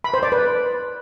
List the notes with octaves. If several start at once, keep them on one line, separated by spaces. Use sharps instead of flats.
B5
C5
D5
B4